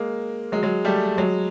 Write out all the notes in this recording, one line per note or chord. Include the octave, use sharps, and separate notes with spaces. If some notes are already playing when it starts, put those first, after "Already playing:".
Already playing: G#3 A#3
F#3 G#3
F#3 G#3
G3 A3
F#3 G#3